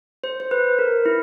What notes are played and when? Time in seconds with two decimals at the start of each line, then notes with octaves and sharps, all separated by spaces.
0.24 C5
0.40 C5
0.51 B4
0.79 A#4
1.06 E4